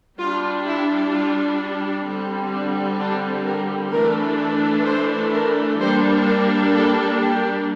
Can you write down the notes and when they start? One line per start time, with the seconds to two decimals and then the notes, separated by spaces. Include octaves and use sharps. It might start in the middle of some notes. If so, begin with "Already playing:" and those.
0.18 G3 D4 F4
0.66 E4
1.12 F4
2.05 D3 G3 C4
2.52 D4
2.99 D4
3.45 A#4
3.92 E3 A3 D4 A#4
4.85 C5
5.32 A#4
5.79 G3 A#3 D4 C5
6.26 A#4
6.73 A4
7.19 G4